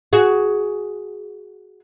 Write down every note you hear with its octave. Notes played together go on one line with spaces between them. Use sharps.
F#4 G#4